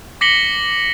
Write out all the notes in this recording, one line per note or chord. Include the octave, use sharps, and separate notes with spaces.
D6 A#6 B6 C#7 F#7 G7